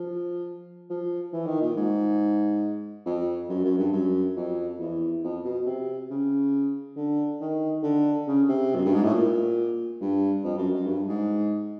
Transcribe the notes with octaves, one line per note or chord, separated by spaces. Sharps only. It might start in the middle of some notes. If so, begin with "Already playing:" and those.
Already playing: F3
F3
E3
D#3
A#2
G#2
F2
F#2
F#2
G2
F#2
F2
E2
F2
B2
C3
C#3
D3
D#3
D3
C#3
C3
F#2
G2
G#2
A2
A#2
G2
F2
F#2
F#2
G2
G#2